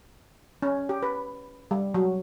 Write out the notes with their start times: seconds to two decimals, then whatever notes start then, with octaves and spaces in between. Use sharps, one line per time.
0.62 C#4
0.89 G4
1.03 B4
1.71 G3
1.94 F#3